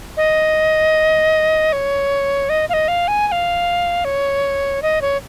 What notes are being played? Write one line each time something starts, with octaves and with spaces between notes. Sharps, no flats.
D#5
C#5
D#5
F5
D#5
F5
G#5
G#5
F5
C#5
D#5
C#5